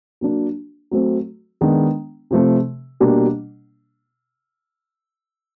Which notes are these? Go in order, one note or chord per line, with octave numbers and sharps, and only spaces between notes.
F#3 A#3 D4
F#3 A3 C4
D#3 G#3 B3 D4
C3 F3 A3
B2 G3 A#3 D4